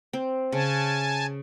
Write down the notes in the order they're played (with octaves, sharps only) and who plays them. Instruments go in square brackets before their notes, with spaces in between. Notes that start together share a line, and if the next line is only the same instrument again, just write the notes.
[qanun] C4
[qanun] C#3 [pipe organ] G#5 A5